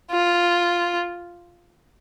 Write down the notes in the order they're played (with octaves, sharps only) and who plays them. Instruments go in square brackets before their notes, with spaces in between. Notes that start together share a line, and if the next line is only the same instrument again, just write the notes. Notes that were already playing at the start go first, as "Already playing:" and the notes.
[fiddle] F4